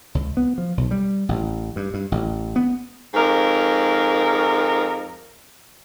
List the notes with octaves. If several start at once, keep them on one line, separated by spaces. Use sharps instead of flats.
C#2
B3
F3
B1
G3
A1
G2
G2
A1
B3
F2 G#2 A#4